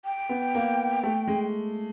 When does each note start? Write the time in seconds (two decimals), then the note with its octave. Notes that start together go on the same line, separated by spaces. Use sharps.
0.05 G5
0.29 B3
0.55 A#3
1.03 A3
1.27 G#3